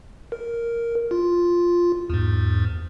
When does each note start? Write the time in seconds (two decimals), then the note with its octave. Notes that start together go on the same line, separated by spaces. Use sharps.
0.32 A#4
1.11 F4
2.10 E2 G#2